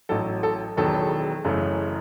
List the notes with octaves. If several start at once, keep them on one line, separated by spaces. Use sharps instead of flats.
A1 A2 F#3 A4
A4
E1 E2 D#3 F#3 B3 A4
F#1 F#2 C#3 E3 A3